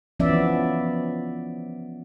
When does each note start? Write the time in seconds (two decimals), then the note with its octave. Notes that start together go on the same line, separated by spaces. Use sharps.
0.20 E3 F3 B3 C#4 D5 E5